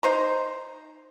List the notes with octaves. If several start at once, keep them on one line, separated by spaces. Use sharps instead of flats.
D#4 C5 A#5